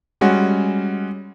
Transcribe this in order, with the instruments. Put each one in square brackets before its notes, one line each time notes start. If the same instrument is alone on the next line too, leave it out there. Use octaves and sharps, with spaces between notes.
[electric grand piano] G3 G#3 C#4 F#4